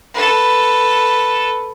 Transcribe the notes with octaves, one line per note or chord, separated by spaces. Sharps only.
A4 B4